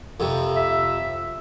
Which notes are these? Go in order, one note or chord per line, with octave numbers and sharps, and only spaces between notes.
F2 C3
E5